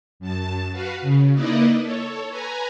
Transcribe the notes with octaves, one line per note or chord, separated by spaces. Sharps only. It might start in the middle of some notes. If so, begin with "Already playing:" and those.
F#2 A5
F#4 B4 F5
C#3
A#3 D#4 E4 B4 D5 D#5
A4 C#5
B4 G#5 A#5